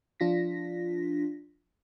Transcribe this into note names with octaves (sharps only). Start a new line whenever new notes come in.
F3 D4 F4 A#6 B6